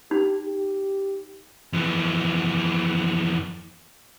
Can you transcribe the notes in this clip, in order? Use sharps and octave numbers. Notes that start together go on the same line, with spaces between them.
D#4 G4
G4
F2 E3